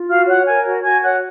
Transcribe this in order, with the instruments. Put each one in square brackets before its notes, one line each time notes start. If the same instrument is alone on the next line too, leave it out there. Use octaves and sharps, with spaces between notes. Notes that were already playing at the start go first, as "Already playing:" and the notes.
Already playing: [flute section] F4
F#4 F5 F6
C#5 F#5 F#6
A#4 G#5 G#6
F#4
F#4 G#5 G#6
C#5 F#5 F#6